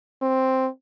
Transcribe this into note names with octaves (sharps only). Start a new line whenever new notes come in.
C4